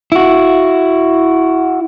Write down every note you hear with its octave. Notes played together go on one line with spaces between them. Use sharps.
E4 F#4